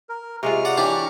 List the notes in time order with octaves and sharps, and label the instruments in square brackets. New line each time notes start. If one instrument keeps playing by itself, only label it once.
[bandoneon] A#4
[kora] C3 G#3 F4 [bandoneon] A#5 C#6 F6
[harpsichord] D5 F#5
[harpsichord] E3 D4 G4 [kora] C#5 D5